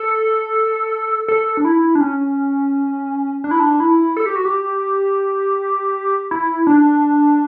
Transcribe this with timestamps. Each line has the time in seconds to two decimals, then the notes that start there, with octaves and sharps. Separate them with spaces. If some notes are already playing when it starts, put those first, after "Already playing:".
Already playing: A4
1.28 A4
1.57 D4
1.65 E4
1.95 D4
2.01 C#4
3.44 D4
3.51 E4
3.60 D4
3.80 E4
4.17 A4
4.26 G4
4.36 F#4
4.45 G4
6.31 E4
6.67 D4